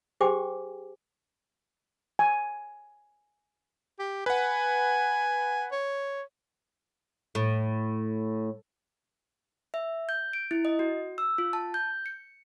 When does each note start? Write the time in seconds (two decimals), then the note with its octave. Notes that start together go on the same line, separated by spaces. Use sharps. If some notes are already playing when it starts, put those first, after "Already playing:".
0.21 G4 G#4 C5 G5 G#5 D6
2.19 G#5
3.99 G4
4.26 B4 F#5 G#5
5.72 C#5
7.35 A2
9.74 E5
10.09 G6
10.33 D7
10.51 E4
10.65 D#5
10.79 F#4
11.18 E6
11.38 F4
11.53 A5
11.74 G6
12.06 C#7